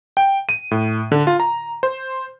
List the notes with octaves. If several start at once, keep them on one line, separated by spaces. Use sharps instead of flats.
G5
D#7
A2
D3
F4
A#5
C5